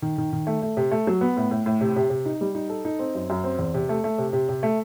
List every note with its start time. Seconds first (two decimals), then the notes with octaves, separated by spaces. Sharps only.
0.02 D#3
0.18 D#3
0.33 D#3
0.47 A3
0.62 A3
0.77 C3
0.91 A3
1.07 F#3
1.21 B3
1.37 A2
1.51 A2
1.66 A2
1.81 C3
1.96 C3
2.10 C3
2.26 D#4
2.41 G3
2.55 D#4
2.69 A4
2.85 D#4
2.99 C4
3.15 F#2
3.30 F#2
3.44 C4
3.59 E2
3.74 C3
3.89 A3
4.04 A3
4.18 C3
4.33 C3
4.49 C3
4.63 A3